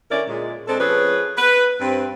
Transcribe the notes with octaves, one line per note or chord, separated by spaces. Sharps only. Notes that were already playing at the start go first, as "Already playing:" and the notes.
D3 C#4 E4 A#4 D5
A#2 G#3
G#3 C4 D4 A4
F3 C#4 G#4 B4
B4
G2 C4